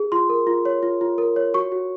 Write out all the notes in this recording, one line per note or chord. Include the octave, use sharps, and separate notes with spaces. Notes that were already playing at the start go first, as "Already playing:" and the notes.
Already playing: G#4
F4 C6
A#4
F4
C#5
F4
F4
A#4
C#5
F#4 C#6
F#4